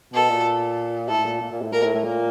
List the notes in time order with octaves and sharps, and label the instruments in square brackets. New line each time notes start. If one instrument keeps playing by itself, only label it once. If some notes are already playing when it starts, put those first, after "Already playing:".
[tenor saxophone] B2 [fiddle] A4
[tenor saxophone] A#2
[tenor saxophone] A2 [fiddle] A4
[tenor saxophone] A#2
A#2
A#2
A2
[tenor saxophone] A#2 [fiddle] A#4
[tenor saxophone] A2
A2
A#2